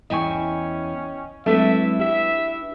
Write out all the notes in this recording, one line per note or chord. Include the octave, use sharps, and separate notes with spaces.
E2 C#4 E4 D#5 G5 G#5 C#6
F#3 G#3 A3 C4 D4 E4 B4 E5
G4 E5